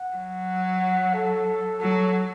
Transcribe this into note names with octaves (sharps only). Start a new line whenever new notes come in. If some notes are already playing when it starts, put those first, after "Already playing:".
Already playing: F#5
F#3
A4
F#3 A4